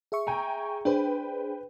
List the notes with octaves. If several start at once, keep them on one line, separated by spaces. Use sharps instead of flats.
G#4 E5 C#6
G5 G#5 A#5
D4 G#4 B4 C5 G5